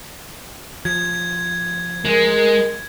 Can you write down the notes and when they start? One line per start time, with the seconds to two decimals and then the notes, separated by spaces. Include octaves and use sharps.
0.85 F3 G#6
2.05 G#3 A#4